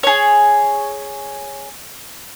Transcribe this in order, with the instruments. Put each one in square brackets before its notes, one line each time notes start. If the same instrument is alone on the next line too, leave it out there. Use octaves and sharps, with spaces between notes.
[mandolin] G#4 C#5